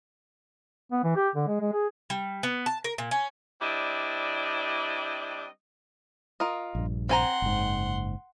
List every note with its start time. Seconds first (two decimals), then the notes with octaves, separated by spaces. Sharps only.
0.92 B3
1.04 E3
1.16 G4
1.36 D3
1.47 G#3
1.61 G#3
1.73 G#4
2.10 G3
2.43 B3
2.66 A5
2.84 A#4
2.98 A#2
3.11 C#4
3.62 G3 C4 D4 E4 D#5
6.40 F4 A#4 D#5
6.75 A#1 G2
7.09 C4 F#5 G#5 A#5 C6
7.42 F#1 G#2